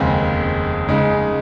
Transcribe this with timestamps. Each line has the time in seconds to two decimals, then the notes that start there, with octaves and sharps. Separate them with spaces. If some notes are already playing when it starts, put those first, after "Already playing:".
Already playing: F1 D#2 C#3 G#3 C4
0.89 C#3 G#3 D#4